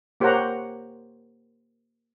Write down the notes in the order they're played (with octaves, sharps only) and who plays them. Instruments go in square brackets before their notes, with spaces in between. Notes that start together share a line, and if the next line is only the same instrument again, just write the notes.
[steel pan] A#3 G4 C5 C#5 F#5 A#5